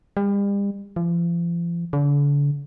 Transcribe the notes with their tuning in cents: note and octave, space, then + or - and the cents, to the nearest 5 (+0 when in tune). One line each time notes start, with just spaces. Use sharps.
G3 +40
F3 -40
D3 -40